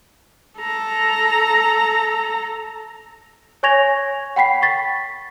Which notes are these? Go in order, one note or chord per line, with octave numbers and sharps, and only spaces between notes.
A4 A#5
C#5 G#5 C#6 G#6 A#6 F7
F#5 G5 B5 B6 C7
C#6 A6 B6